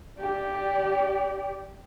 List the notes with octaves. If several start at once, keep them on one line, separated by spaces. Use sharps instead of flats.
G4 D5